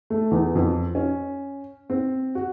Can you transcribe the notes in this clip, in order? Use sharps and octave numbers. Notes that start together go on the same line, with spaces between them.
A3
E2
F2
C#4
C4
F#4